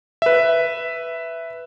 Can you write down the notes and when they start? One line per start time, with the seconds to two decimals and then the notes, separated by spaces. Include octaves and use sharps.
0.22 B4 E5